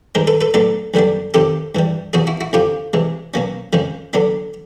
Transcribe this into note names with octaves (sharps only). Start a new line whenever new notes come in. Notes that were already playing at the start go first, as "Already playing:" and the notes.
G2 D#3 G#3 A#4 C5
A4 B4
A4 B4
A2 F#3 B3 D4 A4 B4
F#2 D3 G3 B3 D4
F2 C3 D#3 G4 A4
G2 E3 G3
E2 C3 F3 F#4 G#4
E4 F#4
E4 F#4
F2 D3 F3 F4 G4
C3 E3 G#3
B2 F#3 A#3 C#4
F2 C#3 F3 G#3
D3 F#3 B3 D4